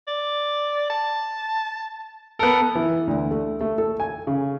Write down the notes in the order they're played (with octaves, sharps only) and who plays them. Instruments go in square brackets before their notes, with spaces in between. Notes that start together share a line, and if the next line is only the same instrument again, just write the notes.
[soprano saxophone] D5
A5
[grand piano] B3 A4 [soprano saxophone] A#4
[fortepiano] E3
D2
A3
A3
A4
G#5
C#3